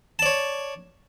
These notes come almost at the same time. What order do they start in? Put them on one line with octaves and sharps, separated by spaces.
A5 D5 C#5